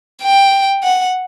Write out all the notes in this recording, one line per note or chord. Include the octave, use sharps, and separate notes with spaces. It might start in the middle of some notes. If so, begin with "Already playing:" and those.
G5
F#5